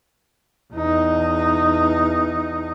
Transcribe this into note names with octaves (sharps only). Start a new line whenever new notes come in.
E2 D#4